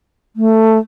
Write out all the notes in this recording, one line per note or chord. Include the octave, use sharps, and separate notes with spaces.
A3